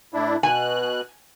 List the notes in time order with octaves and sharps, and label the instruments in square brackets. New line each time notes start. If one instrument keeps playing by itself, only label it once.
[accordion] A2 D4 E4
[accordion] B2 F#6 [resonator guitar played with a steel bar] G#5